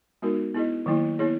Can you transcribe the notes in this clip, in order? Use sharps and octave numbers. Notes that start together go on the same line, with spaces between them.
G#3 B3 D#4 F#4 A#4
B3 E4 G#4 D#5
D#3 F#3 A#3 E4
B3 E4 G#4 C#5